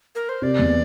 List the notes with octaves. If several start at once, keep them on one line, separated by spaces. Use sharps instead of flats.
A#4
C5
C3 D5
E2